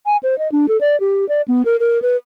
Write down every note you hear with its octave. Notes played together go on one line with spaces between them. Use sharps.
G#5
C5
D#5
D4
A4
D5
G4
D5
B3
A#4
A#4
B4